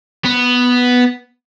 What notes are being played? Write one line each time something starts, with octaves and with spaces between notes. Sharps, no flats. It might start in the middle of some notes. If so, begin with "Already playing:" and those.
B3